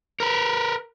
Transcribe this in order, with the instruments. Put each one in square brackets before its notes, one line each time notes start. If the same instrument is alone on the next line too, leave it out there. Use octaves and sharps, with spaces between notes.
[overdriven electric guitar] A#4 B4